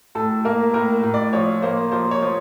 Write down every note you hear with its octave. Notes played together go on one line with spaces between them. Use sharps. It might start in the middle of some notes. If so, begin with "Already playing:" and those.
A2 A4
A#3 A#4
A2 A#4
A2
D5
F3 C#5
A#3 C5
F3 C5
C#5
F3